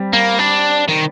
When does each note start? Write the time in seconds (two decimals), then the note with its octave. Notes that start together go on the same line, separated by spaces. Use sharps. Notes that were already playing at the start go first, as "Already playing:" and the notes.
Already playing: G3 C4
0.13 A#3
0.39 D4
0.88 D#3